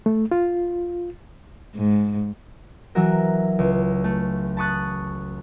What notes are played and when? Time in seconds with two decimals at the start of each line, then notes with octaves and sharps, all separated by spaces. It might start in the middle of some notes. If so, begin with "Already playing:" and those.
0.06 A3
0.31 F4
1.76 G#2
2.95 E3 F#3 E4 F#4 A#4
3.59 C#2
4.04 A3
4.57 A5 B5 C#6 D#6 F#6 A6